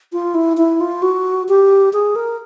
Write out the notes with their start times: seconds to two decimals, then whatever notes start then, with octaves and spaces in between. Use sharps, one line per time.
0.13 F4
0.34 E4
0.57 E4
0.81 F4
1.02 F#4
1.48 G4
1.93 G#4
2.16 A#4